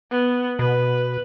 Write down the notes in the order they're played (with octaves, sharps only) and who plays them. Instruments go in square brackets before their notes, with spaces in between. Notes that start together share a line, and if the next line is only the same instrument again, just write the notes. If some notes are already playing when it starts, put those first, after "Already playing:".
[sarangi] B3
[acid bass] B2 [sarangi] B4